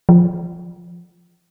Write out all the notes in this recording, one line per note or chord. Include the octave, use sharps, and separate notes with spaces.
F3